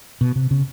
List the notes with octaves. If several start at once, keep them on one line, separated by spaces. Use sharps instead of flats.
B2
C3
C#3